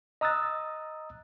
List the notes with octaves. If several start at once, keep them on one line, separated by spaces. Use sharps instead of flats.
D#5 A#5 D#6 E6 F#6 A6